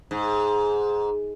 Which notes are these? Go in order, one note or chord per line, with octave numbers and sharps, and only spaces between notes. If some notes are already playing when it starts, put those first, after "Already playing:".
G#2